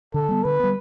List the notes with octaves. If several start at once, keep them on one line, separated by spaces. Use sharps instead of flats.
D3 A4
G3 B3
D3 B4
G3 B3